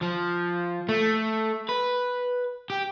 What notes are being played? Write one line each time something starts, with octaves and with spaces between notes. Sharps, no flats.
F3
A3
B4
G4